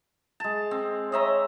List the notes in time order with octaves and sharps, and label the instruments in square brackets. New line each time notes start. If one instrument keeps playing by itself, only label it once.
[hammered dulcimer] G#3 A5
C4
[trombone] C#5 [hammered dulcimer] D#5 E5 A#5